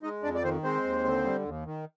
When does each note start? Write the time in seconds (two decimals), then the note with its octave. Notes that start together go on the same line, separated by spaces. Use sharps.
0.03 G#3 D#4 D#5
0.23 F2 D4 D5
0.35 D5
0.44 D#3 C4 C5
0.63 G#3 C4 C5
0.83 D#2
1.05 D3
1.24 G3
1.44 D#2
1.65 D#3